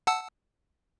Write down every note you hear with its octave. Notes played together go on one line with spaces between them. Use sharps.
F#5 A5 E6